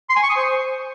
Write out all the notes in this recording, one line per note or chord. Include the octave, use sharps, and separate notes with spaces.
C6
G#5
C#6
D#6
C5